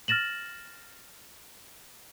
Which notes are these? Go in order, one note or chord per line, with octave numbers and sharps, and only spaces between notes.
F6 A6 A#6 E7 F#7